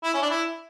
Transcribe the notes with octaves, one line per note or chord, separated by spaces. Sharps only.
E4
C#4
D4
E4